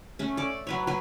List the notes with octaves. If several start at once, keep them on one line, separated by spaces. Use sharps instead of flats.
A3 C#4
A4 D5
F#3 B4 C#5
F#3 B4